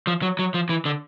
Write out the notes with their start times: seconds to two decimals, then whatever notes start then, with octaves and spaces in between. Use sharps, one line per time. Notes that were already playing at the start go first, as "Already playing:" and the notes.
0.07 F3
0.22 F#3
0.39 F#3
0.54 F3
0.69 E3
0.85 D3